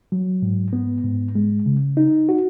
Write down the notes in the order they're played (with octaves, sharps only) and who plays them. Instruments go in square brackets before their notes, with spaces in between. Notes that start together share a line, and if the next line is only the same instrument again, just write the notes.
[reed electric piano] F#3
G#2
B3
G#2
G#3
C#3
D#4
F#4